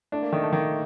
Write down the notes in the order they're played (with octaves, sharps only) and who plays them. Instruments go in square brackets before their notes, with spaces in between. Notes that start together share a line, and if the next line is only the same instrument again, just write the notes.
[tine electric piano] A3 [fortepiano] D4
[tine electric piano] A#3
[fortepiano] D#3 [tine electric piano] A3
[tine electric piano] A3
[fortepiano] D#3 [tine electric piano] A#3